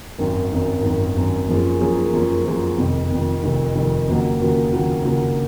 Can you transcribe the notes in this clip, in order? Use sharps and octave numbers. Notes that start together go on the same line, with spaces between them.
G#1 F#2 D#3
G#1 F#2 D#3
G#1 F#2 D#3
G#1 F#2 D#3
F#2 F3 A#3 C#4 G#4
F#2 F3 A#3 C#4 G#4
F#2 F3 A#3 C#4 G#4
F#2 F3 A#3 C#4 G#4
F1 F2 D#3
F1 F2 D#3
F1 F2 D#3
F1 F2 D#3
D#2 C#3 F#3 A#3
D#2 C#3 F#3 A#3
D#2 C#3 F#3 A#3
D#2 C#3 F#3 A#3